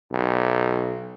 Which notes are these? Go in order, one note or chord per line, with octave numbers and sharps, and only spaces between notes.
B1